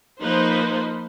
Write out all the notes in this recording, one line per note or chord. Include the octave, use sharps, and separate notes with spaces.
F3 A#3 D#4 B4 C5